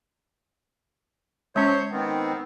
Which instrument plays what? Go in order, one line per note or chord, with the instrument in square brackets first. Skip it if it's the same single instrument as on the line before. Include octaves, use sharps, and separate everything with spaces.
[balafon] G#3 C#4 [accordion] C5 C#5 G6
[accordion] D#3 B3 C4